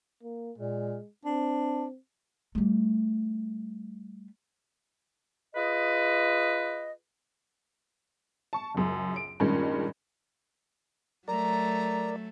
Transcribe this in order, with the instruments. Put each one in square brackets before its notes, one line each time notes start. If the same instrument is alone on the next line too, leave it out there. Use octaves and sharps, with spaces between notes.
[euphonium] A#3
[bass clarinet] A#2 [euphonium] G#3
[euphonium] C4 [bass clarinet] D4
[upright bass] G3 A3
[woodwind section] F4 G#4 B4 D#5
[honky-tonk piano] A5 C#6
F#1 C#2 F#2
D7
G2 A#2 D#3 G#3 C#4
[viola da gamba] F#3 A3 [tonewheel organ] A#4 D5 [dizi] A#5